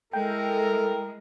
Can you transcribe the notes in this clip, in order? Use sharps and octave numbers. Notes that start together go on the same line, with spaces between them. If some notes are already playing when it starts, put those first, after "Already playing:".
G#3 E4 A4 A#4 G5